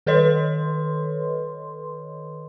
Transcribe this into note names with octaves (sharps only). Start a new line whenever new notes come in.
D#3 A4 B4 C#5 D#5 C6